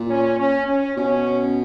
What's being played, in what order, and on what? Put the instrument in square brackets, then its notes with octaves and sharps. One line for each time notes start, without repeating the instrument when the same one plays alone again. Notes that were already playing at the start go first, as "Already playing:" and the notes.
Already playing: [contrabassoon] A#2
[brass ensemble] C#4
C#4
C#4
[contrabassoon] B2 [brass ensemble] C#4